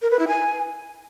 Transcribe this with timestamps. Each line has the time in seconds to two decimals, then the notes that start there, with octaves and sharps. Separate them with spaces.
0.02 A#4
0.11 B4
0.19 E4
0.28 G#5